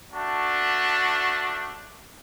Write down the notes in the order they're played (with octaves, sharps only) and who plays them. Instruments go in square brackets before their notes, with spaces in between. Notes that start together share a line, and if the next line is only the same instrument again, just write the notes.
[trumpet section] A3 D4 F#4 A5